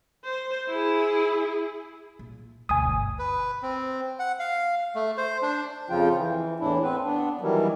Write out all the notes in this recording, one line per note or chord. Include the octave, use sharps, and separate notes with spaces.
C5
E4 G#4
A#2
D2 B2 G#5 D#6
G1
B4
C4
F#5
F5
A3
C5
D4
F2 C#3 F3 F4 G5
E3
E2 A2 E3 D4 E4
B3 C4 B4
B3 D4
D#3 E3 F#3 G3